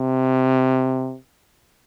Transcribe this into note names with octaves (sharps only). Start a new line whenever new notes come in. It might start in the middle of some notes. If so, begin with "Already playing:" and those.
Already playing: C3